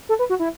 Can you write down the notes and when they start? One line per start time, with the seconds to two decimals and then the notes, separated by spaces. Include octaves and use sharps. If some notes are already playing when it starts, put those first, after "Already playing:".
0.09 A4
0.19 B4
0.30 F#4
0.39 E4